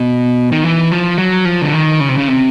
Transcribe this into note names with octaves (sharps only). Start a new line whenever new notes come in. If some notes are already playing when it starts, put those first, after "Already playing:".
Already playing: B2
D#3
E3
F3
F#3
F3
D3
D#3
C#3
C3
C#3
C3